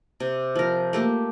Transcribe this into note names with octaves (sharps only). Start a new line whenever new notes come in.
C3
F3 A#4
A3 A#3 G4